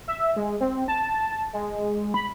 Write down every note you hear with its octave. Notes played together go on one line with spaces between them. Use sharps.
E5
G#3
C4
A5
G#3
B5